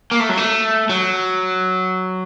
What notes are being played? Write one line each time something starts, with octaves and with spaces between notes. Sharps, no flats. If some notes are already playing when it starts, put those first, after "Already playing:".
A#3
A3
F#3
A3
F#3